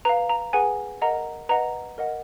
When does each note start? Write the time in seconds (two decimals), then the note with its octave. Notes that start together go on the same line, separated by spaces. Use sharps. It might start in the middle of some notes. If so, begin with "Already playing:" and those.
0.05 B4 F5 A#5
0.30 A#5
0.53 G#4 B4 F#5 G#5
1.02 A#4 D#5 F#5 A#5
1.49 B4 D#5 F#5 A#5
1.98 A#4 D#5 F#5